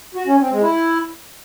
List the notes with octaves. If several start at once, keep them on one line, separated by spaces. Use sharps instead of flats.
F#4
C#4
C4
G#3
E4